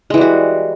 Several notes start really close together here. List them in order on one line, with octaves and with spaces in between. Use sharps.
G#3 E3 G3 F#4